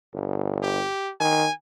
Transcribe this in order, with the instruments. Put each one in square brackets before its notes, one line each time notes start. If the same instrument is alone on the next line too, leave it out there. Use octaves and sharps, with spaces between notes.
[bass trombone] G1
[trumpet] G4
[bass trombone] D#3 [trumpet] G#5